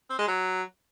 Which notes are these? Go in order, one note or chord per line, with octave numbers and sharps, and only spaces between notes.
C4
G#3
F#3